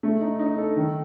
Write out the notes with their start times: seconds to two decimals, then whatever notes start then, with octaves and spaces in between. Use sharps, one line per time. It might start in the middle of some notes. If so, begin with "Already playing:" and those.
0.03 A3
0.21 D#4
0.39 D#4
0.58 A4
0.76 D#3